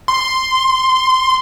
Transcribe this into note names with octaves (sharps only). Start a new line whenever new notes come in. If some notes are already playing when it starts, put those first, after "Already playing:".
C6